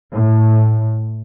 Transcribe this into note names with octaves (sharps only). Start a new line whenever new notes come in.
A2